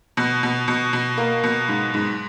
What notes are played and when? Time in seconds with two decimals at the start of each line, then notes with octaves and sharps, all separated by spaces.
0.17 B2
0.43 B2
0.68 B2
0.93 B2
1.17 A#3
1.43 B2
1.68 G#2
1.94 G#2